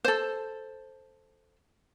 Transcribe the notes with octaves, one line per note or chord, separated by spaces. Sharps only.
A4 C5